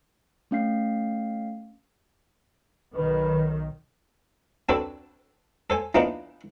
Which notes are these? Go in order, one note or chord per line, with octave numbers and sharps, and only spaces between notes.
A3 C#4 F5 C7
B1 D#3 B4
C4 D4 F#4 A4 B4
A4 C5 G#5
E3 F3 A#3 B3 D4 D#4